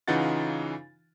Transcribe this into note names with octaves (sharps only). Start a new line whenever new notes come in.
C#3 E3 D#4 F4 F#5 A6